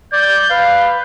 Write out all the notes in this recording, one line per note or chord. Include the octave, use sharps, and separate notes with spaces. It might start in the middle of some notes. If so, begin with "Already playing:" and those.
D5 G6
B4 F5